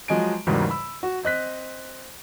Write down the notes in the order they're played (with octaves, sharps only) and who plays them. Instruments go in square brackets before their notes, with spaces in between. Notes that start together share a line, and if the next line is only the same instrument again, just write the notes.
[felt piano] F3 F#3 G#3 D#5 G#5 D7
E2 G#2 C#3 F#3 G3 A#3
B5 E6
F#4
C4 D#5 F#6 B6